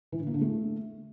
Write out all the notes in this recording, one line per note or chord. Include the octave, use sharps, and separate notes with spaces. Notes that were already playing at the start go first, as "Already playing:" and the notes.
E3
D3
A#3
D3
A3